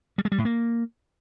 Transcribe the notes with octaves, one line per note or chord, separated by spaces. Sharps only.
G3
G#3
G3
A2
A#3